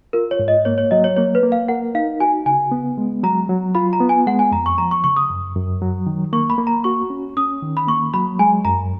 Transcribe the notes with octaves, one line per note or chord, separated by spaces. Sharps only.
F4 A#4
C#5
G#2
D#5
A#3 C#5
C#5
F#3 D#5
C#5
A#3 C#5
B4
A#3
F5
A#4 F#5
D#4 F5
F#4 G#5
C#3 G#5
B3
G#3
F#3 A#5
F#3
F4 B5
A#5
B3
G#5
G#3 F#5
G#5
F2 A#5
C#6
F3 A#5
C#6
C#3 C#6
D#6
F#2
F#2
F#3
D#3
A#3 C#6
B5
A#3
A#5
F#4 C#6
C#4
C#4 D#6
D#3
B5
A#3 C#6
F#3 B5
G#3 G#5
F#2 A#5